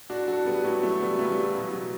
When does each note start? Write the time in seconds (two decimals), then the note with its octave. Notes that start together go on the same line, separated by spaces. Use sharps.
0.09 A2 D4 F#4
0.28 F#3 F#4 A4
0.46 A2 G3 B3
0.64 A2 F#3 A3
0.83 E3 F#3 A3
1.01 C#3 G3 B3
1.19 C#3 F#3 A3
1.32 G3
1.37 E3
1.43 F#3
1.55 B2
1.73 F#3